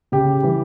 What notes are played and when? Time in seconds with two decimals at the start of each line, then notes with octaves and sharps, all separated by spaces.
0.12 C#3 G4
0.43 E3 G3